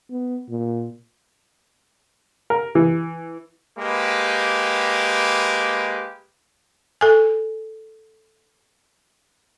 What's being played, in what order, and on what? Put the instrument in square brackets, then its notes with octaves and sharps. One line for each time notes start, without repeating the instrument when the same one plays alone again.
[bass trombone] B3
A#2
[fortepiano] A#4
E3
[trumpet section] G#3 A#3 G4 B4
[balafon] A4 G#5